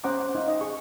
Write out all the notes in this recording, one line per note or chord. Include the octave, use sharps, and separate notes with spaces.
C#4 C5 F#5 A#5 D6
F#5
D#4 F5
D#5 G5
G#4 C#6